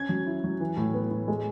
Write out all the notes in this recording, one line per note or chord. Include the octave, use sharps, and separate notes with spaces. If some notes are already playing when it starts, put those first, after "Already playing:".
Already playing: C#4 G#6
F#3
E4
F#3
E3
A2
B3
A2
G#3